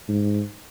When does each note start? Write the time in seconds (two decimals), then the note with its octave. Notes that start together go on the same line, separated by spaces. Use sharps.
0.08 G#2